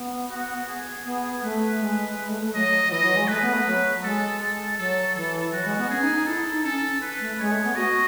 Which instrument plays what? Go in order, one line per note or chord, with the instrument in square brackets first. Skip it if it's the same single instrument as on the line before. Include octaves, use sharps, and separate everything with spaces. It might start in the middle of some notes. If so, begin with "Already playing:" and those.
Already playing: [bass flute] B3
[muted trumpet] F#4
G#4
[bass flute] B3 [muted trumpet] G#4
[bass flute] A3 [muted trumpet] B4
[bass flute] G#3
G#3
A3
A3
[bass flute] F#3 [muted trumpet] D#5
[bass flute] F#3
[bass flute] E3 [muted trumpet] D#5
[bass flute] F#3
G#3
[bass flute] A3 [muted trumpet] B4
[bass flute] B3
A3
F#3
[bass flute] G#3 [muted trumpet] A4
[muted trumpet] A4
[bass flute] F#3 [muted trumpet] A4
[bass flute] E3 [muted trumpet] A4
[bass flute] F#3 [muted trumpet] F#4
[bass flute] G#3
B3
[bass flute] C#4 [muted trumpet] G#4
[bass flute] D#4
D#4
[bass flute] E4 [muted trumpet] A4
[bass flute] D#4
[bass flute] C#4 [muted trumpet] A4
[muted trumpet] B4
[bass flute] A3
[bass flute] G#3 [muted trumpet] C#5
[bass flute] A3
B3
[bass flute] F#4 [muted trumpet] D#5